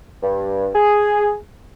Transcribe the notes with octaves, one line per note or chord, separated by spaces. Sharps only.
G2
G#4